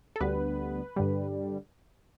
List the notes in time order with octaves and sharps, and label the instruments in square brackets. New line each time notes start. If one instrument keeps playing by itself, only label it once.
[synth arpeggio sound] A4
D2 D3 G3 B3 B4
G2 D3 G3